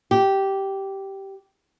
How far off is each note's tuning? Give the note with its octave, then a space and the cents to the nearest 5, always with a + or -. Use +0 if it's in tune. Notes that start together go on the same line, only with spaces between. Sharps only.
G4 -10